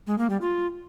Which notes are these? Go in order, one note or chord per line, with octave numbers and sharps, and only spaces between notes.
G#3
A#3
G3
F4